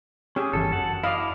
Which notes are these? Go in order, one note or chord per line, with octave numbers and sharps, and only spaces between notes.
C#4 G4 G#4
G1 C#3 E3 A4
F#2 F#5 A5
E4 D5 D#5 F5